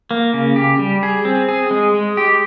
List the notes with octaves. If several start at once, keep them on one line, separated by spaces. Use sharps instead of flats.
A#3
C#3
G4
G3
G#4
C4
G#4
G#3
G#3
G4